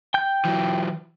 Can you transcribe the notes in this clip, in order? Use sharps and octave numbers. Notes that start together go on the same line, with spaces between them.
G5 G6
E3 F#3